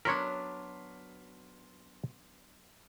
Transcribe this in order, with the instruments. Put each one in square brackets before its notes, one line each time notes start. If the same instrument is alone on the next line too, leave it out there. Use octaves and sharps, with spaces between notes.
[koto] F#3 B3 D4 [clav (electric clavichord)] A#4 C#5 [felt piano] C6 F6 B6